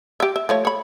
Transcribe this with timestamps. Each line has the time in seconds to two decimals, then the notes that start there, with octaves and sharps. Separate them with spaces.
0.20 G4 E5
0.36 E5
0.49 F3 A3 C#5
0.65 C#5 B5